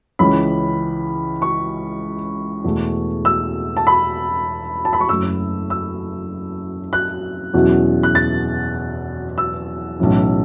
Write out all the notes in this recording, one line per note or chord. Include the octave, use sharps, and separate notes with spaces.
C#2 C#3 E3 C#4 B5
C#6
E2 B2 A3
E6
A5
B5
A5
B5
C#6
F#1 F#2 F#3 A3 E6
E6
F#6
E2 B2 F#3 C#4 E4
F#6
A6
E6
B1 A2 E3 C#4